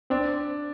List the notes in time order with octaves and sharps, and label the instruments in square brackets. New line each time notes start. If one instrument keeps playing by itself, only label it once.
[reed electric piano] C4 [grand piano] D4